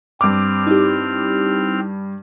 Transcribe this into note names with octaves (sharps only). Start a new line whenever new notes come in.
G2 C4 D6 F6
D#4 E4 G4